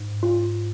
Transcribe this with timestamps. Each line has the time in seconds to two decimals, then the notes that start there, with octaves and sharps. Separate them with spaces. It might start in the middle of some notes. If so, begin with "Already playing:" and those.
Already playing: G#2
0.23 F4